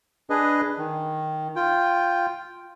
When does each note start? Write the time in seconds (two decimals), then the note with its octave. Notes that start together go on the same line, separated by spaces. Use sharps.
0.30 D4 G#4 B4 D#5
0.78 D#3
1.56 F4 G5